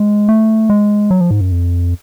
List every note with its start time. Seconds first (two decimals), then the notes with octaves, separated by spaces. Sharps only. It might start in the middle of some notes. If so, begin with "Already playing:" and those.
Already playing: G#3
0.29 A3
0.70 G#3
1.11 F#3
1.21 F3
1.31 G#2
1.41 F#2
1.51 F2